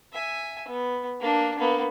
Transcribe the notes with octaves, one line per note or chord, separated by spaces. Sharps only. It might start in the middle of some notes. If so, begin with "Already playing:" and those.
E5 G#5
B3
A#3 D4
A#3 B3